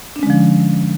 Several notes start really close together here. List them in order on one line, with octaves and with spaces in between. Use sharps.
D4 C#4 G#3 D3 F3